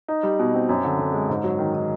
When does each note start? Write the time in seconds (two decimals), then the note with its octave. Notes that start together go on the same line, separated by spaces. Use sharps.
0.08 D#4
0.23 G3
0.39 B2
0.54 C4
0.69 F#2
0.85 D3
0.99 D3
1.14 G#3
1.30 G#2
1.44 F#3
1.59 D#3
1.75 D#3